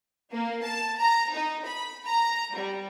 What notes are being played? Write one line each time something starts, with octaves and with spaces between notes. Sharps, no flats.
A#3
A5
A#5
D#4
B5
A#5
G3